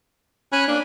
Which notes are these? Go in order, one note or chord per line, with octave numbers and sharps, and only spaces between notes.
C#4 G#5 B5 F#6
A#3 D4